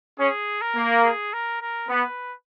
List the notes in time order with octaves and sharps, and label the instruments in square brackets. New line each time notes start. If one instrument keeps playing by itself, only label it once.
[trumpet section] C#4 [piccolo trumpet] G#4
[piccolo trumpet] A#4
[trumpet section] A#3
[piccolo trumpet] G#4
A#4
A#4
[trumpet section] B3 [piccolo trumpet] B4